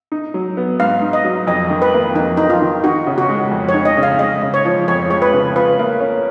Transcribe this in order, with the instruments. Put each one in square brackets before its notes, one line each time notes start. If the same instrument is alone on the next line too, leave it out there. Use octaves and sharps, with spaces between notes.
[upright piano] D#4
F#3
B3
[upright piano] G#2 [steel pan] F5
[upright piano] D#4
[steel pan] D#5
[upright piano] F#3
[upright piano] F2 [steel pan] D#5
[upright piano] D#3
[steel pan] B4
[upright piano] A#3
[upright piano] F2 [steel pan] D#4
[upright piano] F2 [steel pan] D#4
[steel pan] F4
[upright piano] D#3
[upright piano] D#4 [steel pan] F#4
[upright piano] C#3
[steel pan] F#4
[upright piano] G#3
F2
[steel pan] C#5
[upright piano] D#4
[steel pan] D#5
[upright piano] C#3
[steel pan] F5
[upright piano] G#3 [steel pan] D#5
[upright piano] C#3
[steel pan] C#5
[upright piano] F3
[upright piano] F2 [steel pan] C#5
[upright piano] G#3 [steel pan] C#5
[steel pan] B4
[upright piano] C#3
[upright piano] F4 [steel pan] B4
[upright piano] A#3
C#4